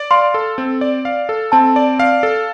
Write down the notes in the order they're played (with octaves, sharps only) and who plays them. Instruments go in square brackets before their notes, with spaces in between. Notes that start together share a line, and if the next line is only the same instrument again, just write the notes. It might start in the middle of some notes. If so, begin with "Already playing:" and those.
Already playing: [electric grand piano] D5
[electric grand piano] F5 [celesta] C6
[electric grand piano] A4
C4
D5
F5
A4
[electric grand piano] C4 [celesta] A5
[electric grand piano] D5
F5
A4